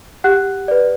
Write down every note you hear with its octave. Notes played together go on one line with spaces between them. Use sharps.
G4 F#5 F#6
B4 D5